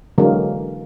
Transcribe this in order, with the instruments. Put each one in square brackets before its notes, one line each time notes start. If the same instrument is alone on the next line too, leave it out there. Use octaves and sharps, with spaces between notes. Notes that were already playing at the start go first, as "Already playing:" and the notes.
[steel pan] D3 E3 F#3 G#3 A#3